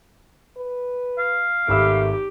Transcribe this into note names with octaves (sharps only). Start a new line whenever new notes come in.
B4
F5
G#1 A3 G4 B5 E6